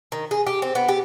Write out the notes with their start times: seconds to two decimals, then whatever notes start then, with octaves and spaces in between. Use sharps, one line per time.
0.12 D#3
0.31 G#4
0.47 G4
0.62 C4
0.75 B3
0.88 G4